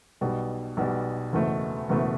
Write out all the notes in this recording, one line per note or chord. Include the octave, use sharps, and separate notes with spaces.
B1 B2 G3
B1 B2 G3
F#1 E2 B2 A3
F#1 E2 B2 A3